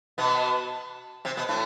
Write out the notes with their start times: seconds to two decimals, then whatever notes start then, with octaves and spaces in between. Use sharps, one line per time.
0.18 B2 B3
1.25 C3 C4
1.37 B2 B3
1.49 A2 A3